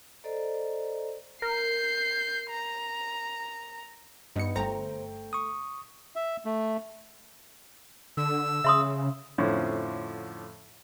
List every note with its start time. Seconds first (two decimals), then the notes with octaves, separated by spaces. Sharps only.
0.24 A4 C5 D5 D#5 A#5
1.42 A#4 G6 C7
2.50 A#5
4.36 G2 B3 D#4 C#7
4.56 G1 A3 C5 G5 A#5
5.33 C#6 D#6
6.16 E5
6.45 A3
8.17 D3 E6
8.64 C#3 E5 C6 D#6
9.38 F2 A2 D3 F3 C#4